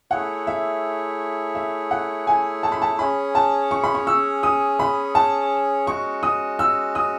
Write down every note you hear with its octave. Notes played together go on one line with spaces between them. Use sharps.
A3 E4 G#4 C#5 F#5
E5
E5
F#5
G#5
A5
B5
A5
C#4 G#4 C#5 B5
A5
C#6
B5
C#6
E6
D#6
B5
A5
G#3 C#4 F#4 C#6
D#6
E6
D#6